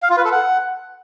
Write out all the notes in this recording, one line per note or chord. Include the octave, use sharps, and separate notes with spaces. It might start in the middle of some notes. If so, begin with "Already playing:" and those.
F5
F4
B4
A4
F#5